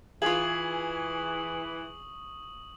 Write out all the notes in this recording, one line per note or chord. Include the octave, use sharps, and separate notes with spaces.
E3 F4 G#4 E5 C#6 D#6 F#7